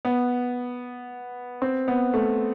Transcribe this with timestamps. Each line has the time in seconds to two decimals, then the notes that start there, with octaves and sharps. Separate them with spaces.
0.05 B3
1.62 C4
1.88 B3
2.14 A3